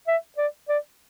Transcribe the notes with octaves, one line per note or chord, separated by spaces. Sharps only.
E5
D5
D5